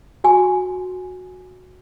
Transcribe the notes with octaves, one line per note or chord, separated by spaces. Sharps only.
F#4 G#5